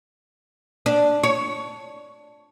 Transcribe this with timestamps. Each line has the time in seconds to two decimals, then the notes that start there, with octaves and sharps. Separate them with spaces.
0.86 D4
1.23 C#5